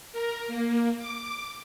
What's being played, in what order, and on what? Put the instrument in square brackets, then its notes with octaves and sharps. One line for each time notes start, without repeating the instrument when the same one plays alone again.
[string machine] A#4
A#3
D6